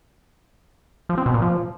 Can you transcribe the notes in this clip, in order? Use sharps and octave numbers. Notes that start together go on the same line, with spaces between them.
F3
C4
B2
A#2
F3